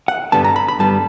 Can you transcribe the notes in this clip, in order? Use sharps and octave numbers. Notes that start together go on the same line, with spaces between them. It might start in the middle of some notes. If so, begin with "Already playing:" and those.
F#5
G2 D3 G3 B3 A5
A#5
B5
B5
G2 D3 G3 B3 A5